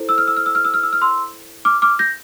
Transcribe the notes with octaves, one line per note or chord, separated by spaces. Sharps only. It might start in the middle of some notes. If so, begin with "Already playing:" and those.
Already playing: E4 A4 C5
E6
F6
E6
F6
E6
F6
E6
F6
E6
F6
C6 E6
D6 F6
D6 F6
G6 A#6